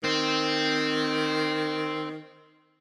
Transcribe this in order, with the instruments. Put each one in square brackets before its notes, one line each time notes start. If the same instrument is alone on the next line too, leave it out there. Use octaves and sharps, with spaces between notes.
[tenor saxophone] D#3 [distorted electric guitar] C4